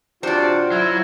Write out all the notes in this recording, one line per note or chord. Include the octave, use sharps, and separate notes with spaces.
C3 D4 F4 F#4 C5 D5
F#3 E4